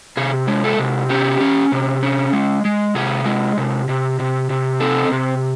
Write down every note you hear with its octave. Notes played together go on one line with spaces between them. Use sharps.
C3 G#4
G#3
A4
C3
C#4 G4
C#4
C3
C#4
G#3
G#3
C3 G#4
G#3
C3
C3
C3
C3
C4 A4
C3